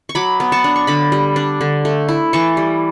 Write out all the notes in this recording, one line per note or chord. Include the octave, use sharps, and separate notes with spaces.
C#6
F#3 B5 D6
B3
A5 C#6
D4
C#6
D3 B5 D6
G3
D4
D3
A3
E4
E3 A5 C#6
G3